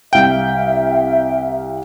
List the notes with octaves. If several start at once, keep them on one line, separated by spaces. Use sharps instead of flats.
C2 E5 F5 G5